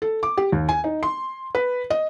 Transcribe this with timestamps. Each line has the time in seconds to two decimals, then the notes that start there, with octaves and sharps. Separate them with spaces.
0.02 A4
0.23 D6
0.37 G4
0.52 D#2
0.69 G#5
0.84 D#4
1.03 C6
1.55 B4
1.90 D#5